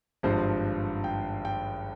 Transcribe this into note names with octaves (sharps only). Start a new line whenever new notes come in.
G#1 G2 F3 C5
G5
G5